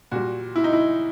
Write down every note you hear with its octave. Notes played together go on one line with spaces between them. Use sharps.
A#2 G3 F#4
E4
D#4
E4